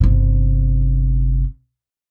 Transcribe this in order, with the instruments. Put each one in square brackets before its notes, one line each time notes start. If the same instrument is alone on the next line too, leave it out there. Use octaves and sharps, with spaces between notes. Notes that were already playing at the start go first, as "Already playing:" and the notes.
[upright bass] G1 C3